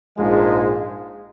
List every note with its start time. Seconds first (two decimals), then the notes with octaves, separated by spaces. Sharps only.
0.16 A#1 G#2 F3 G#3